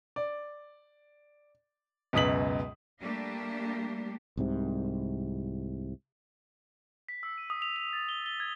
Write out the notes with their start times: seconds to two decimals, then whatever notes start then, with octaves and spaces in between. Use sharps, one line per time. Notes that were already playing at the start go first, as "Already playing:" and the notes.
0.16 D5
2.13 C#2 F#2 B2 D#6 B6 F#7
3.00 G3 A3 A#3 D4 G4
4.37 C2 G#2 C3
7.09 B6
7.23 E6
7.38 D#7
7.50 D#6
7.62 F7
7.76 F7
7.93 A6
8.09 G7
8.26 G7
8.40 G#6